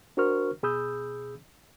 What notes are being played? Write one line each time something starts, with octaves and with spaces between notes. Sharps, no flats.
D4 F#4 A#4 C5 C#6 F6
B2 G#4 B5 D#6 E6 G6